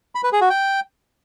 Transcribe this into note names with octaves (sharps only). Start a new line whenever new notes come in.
B5
B4
G#4
F#4
G5